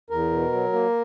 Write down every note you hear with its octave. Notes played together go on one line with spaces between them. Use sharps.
E2 A#4
B2
F#3
A#3